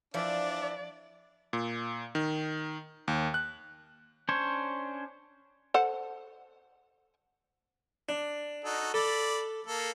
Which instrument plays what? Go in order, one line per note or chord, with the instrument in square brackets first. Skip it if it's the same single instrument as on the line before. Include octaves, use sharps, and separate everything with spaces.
[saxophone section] E3 E5 [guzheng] F3 [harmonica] D4 [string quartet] D5
[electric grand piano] A#2
D#3
D#2
F#6
[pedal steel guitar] C#4 D4 C5 C#5
[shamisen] A4 C5 F#5
[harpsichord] D4
[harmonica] D#4 F#4 A4
[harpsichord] A4 [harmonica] D5 B5
[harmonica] A#3 A4